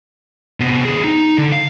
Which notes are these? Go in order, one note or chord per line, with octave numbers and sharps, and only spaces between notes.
C3 B3
D#2 G#4
D#4
D3
F5